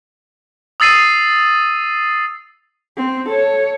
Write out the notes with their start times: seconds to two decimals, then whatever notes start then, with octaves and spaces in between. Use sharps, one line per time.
0.80 D#6 E6 A6 C7 D#7
2.97 C4
3.29 A4 C#5